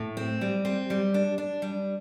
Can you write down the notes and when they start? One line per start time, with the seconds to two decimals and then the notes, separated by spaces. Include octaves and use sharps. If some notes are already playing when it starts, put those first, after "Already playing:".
Already playing: A2
0.17 C4
0.41 G3
0.65 C4
0.90 G3
1.14 D4
1.38 D4
1.62 G3